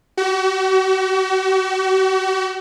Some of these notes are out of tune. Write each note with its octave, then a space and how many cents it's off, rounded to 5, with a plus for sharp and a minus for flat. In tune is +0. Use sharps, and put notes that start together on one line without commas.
F#4 +40